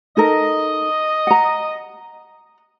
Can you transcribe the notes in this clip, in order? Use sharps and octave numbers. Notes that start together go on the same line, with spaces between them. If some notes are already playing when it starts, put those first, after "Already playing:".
D#4 A4 A#4 D#5
F#5 A#5